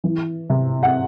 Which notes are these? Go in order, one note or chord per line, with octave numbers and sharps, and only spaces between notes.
E3
C3
F#5